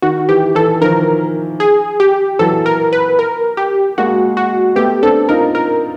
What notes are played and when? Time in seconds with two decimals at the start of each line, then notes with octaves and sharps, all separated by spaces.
0.02 D#3 F#4
0.29 E3 G4
0.55 E3 A4
0.81 D#3 F3 A#4
1.60 G#4
2.00 G4
2.39 E3 F#3 A4
2.66 A#4
2.93 B4
3.19 A#4
3.57 G4
3.98 G#3 A#3 F#4
4.37 F#4
4.76 A3 B3 G4
5.02 C4 D4 A4
5.29 D#4 F4 A#4
5.55 A#4